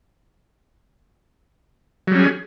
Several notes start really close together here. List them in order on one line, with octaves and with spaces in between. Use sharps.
F#3 G3 C#4 G#4